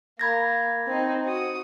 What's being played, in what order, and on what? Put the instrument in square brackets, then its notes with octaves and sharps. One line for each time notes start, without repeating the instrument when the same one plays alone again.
[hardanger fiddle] A#3 [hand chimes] B5 G#6 A#6
[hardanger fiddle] C4 D#4
F#4 D#6